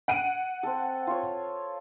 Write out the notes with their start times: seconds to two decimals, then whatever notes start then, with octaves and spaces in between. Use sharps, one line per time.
0.08 F#5 D7 D#7
0.63 C4 A4
1.07 F4 C#5